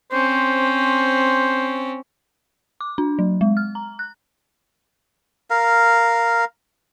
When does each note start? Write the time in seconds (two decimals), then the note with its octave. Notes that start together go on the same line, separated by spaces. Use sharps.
0.12 C4 C#4 C5
2.81 D6
2.98 D4
3.19 F#3
3.41 G#3
3.57 F6
3.75 A#5
3.99 F#6
5.50 A#4 F5